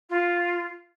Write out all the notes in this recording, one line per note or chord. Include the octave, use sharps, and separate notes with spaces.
F4